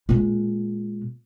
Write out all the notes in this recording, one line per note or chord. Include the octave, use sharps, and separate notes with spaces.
A#2 G#3